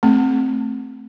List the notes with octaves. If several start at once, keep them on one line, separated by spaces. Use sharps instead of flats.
A3 C4